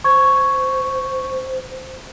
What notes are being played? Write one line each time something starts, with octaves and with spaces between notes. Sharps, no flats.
C5 C#6 G#6